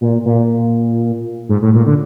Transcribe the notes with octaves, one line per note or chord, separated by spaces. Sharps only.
A#2
A#2
G#2
A2
A#2
D3